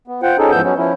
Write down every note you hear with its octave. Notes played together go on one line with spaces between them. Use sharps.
B3
F4 C5 F#5 G5
C#4 D#4 G#4 A4
G#2 E3 F3 B3 E6 G6
F#3 B3 C#4
F3 C#4 E4